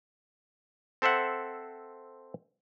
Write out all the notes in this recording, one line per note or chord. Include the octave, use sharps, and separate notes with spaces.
C4 A4 C5 E5 F#5